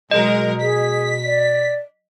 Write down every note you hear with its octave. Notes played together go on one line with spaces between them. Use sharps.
B2 F#3 G#3 A#4 D#5
G#4 B6
D5